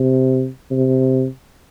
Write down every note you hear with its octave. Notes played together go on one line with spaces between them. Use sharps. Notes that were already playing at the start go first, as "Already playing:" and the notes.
Already playing: C3
C3